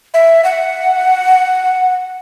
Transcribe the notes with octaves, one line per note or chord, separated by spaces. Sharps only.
E5
F#5